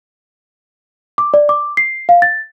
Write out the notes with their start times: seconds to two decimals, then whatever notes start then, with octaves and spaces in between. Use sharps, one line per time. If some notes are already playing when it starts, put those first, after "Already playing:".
1.18 D6
1.34 D5
1.49 D6
1.77 C7
2.09 F5
2.22 A6